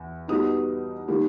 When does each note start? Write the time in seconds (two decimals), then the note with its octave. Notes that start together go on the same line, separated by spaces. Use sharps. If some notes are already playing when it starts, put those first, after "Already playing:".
Already playing: E2
0.28 B2 G3 B3 D#4 D#6
1.08 D#3 G3 A#3